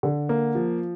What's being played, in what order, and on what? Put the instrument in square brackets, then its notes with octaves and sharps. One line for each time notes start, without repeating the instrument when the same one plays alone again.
[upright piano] D3
A#3
F3